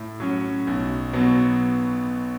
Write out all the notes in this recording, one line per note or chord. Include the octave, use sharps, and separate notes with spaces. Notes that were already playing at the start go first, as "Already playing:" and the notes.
Already playing: A2
F#3 C#4
B1
B2 F#3 B3